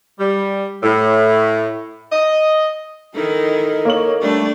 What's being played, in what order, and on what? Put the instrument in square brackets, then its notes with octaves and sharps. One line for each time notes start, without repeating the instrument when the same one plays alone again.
[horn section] G3
A2
D#5
[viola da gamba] D#3 D#4 E4 [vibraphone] A4 [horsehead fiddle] A#4 D#5
[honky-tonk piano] A#3 C#5 F#7
[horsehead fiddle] G3 A3 [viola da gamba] D4 D5